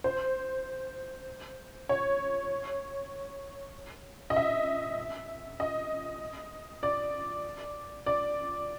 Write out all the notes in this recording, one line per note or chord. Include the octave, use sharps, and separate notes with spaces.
C5
C#5
D#5
E5
D#5
D5
D5